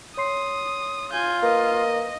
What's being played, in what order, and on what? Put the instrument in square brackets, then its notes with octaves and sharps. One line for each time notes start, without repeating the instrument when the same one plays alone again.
[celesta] C#5 C6 C7 [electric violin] D#6
[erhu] F4 [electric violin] G#5 G6
[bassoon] A#3 [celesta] B4 [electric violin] D#5